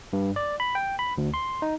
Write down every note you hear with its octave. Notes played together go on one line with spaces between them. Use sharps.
G2
D5
B5
G5
B5
D2
C6
D#4